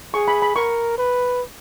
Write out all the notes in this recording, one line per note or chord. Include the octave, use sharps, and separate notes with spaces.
G#4 C#6
B5
B5
A#4 C#6
B4